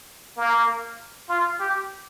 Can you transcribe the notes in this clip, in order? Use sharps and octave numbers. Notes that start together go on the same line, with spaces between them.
A#3
F4
G4